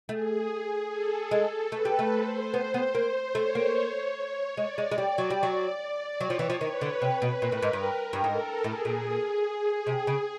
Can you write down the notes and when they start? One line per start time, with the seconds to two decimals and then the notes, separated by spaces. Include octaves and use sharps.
0.09 A3 G#4
0.90 A4
1.31 G#3
1.71 A3 B4
1.85 G3
1.99 A3
2.13 C5
2.54 B3
2.74 B3
2.95 A#3
3.35 A3 C#5
3.55 A#3
4.57 G#3 D5
4.78 G#3
4.91 G#3
4.98 G3
5.18 F#3
5.30 G3
5.43 F#3
6.20 F#3 C#5
6.30 F3
6.39 E3
6.50 F3
6.60 D#3 B4
6.81 D3
7.02 C3
7.22 B2
7.42 A#2 A#4
7.52 A2
7.62 G#2
7.73 G2
8.13 G2
8.23 G#2 A4
8.64 A2 G#4
8.85 A#2
9.87 C3
10.07 C#3